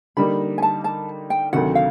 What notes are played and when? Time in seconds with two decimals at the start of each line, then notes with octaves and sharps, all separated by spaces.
0.17 D3 G3 A#3 D#4 B5
0.58 G#5
0.62 A5
0.84 A5
1.30 G5
1.53 D2 C3 D#3 F#3 F#5
1.75 F5